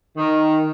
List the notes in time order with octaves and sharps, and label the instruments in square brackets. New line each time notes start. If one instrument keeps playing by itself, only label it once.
[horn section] D#3